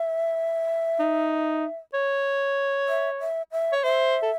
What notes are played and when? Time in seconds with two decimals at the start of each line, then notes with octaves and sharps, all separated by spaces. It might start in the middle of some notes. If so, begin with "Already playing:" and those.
Already playing: E5
0.99 D#4
1.94 C#5
2.88 E5
3.20 E5
3.52 E5
3.72 C#5
3.83 C5 E5
4.22 A4